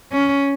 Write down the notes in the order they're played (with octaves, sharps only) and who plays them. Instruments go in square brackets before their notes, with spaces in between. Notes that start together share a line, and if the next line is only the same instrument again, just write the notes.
[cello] C#4